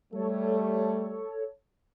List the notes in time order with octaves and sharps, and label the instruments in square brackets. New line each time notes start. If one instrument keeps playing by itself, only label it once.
[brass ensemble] G3 A3 [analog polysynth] A4 C#5